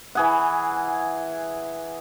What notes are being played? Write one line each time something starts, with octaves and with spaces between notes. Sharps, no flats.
E3 G#4 F#5